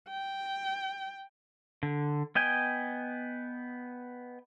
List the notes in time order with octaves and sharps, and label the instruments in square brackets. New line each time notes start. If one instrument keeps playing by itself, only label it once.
[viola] G5
[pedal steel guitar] D3
B3 D#5 G5 G#5